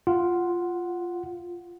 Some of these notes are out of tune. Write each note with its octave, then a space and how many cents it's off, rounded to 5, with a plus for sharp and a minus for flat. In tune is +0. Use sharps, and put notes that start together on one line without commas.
F4 +0 F#5 +0